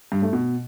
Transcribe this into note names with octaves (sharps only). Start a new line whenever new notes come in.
G2
A3
B2